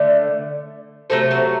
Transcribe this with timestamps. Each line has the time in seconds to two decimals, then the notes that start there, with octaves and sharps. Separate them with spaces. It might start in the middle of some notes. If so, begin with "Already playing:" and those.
Already playing: D3 A3
1.10 C3 F#3 A3 A4 C5
1.31 F#4 A4